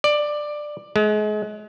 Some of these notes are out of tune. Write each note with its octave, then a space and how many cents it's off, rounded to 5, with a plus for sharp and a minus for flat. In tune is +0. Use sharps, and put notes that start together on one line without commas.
D5 +15
G#3 +35